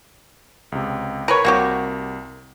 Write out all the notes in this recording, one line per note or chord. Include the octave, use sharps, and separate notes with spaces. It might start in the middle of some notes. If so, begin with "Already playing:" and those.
C#2 C3
A#4 B4 C#5
C2 C3 A#3 F#4 G4